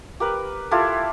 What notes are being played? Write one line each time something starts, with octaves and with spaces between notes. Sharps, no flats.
G4 A#4 B4
E4 F4 G4 A4